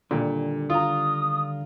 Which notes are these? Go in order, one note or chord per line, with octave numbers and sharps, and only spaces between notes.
A#2 D3 D#3 G3
F4 A#5 D#6